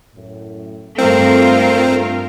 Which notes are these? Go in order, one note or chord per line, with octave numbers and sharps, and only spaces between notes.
F#2 A2
G2 A3 C4 F4 A#4